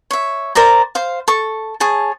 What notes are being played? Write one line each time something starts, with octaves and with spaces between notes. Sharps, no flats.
C#5 E5
A#4 C5 D5 A#5
C5 F5
A4 C#6
G#4 C#5 A5